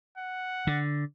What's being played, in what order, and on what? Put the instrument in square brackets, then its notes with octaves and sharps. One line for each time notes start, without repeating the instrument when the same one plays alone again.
[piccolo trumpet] F#5
[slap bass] D3